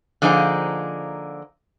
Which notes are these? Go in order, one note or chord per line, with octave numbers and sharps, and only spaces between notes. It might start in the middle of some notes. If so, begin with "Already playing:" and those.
D3 F3 A#3 D#4 G#4 C5